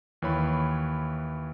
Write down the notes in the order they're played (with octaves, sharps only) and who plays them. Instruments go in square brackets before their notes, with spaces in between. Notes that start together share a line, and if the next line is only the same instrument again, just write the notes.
[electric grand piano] D#2 E3 C#5 B5